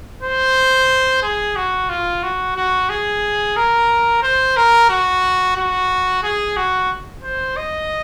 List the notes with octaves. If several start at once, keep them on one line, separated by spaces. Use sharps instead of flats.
C5
G#4
F#4
F4
F#4
F#4
G#4
A#4
C5
A#4
F#4
F#4
G#4
F#4
C5
D#5